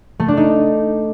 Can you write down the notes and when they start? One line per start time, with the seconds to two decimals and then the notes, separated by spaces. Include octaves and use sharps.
0.20 A3
0.28 D4
0.37 D#4